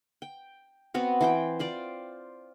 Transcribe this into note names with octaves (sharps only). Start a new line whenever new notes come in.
G5
B3 C4 F#4
E3 C5 G5
F4 C5 D5